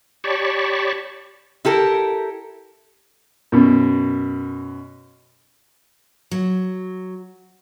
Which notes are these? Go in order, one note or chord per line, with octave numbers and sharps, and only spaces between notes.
G4 C#5 D5 A5 B5 C#6
E4 G4 A4 A#4
F#2 B2
F#3